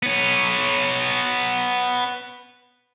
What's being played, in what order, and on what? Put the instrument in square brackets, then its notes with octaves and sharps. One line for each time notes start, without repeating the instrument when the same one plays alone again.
[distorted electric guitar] B3 C#5